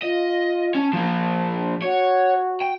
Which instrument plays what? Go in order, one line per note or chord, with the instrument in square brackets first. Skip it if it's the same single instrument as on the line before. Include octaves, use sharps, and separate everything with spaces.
[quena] F4 [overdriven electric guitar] D#5
[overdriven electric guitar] C#4 [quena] A5
[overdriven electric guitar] F3 A#3
[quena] F#4 [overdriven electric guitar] C#5
[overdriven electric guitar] G5